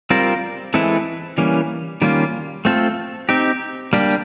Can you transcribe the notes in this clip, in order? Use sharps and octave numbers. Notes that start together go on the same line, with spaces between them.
G3 C4 F4 A#4
E3 G#3 C4 E4 A4
E3 G3 A#3 C#4
D#3 G3 A#3 C#4 F4
A3 C4 F4 A4
C4 D#4 G4
G3 A#3 D4 G4